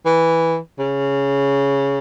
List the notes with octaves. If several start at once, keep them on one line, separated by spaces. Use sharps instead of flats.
E3
C#3